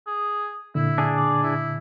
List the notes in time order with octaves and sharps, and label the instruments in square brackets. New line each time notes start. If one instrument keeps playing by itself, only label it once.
[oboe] G#4
[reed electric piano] A#2 D3 [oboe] E4
[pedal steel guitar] D4 G#4
[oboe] D5
E4